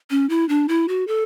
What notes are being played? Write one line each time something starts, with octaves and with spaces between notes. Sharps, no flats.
C#4
E4
D4
E4
F#4
A4